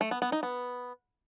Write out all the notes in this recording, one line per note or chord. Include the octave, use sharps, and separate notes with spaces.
A3
B3
B3
D#4
B3